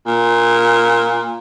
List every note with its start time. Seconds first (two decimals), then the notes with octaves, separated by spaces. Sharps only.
0.07 A#2